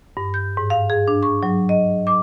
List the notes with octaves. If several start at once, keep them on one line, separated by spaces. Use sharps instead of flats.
G2
G6
G#2
F5
G#4
D4
C#6
F#3
D#5
D6